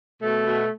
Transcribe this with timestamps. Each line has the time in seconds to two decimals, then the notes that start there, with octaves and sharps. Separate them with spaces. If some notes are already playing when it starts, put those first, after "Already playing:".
0.22 B2 A3
0.45 B2